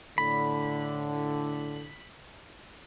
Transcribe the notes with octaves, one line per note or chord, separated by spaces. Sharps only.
A2 D3 B5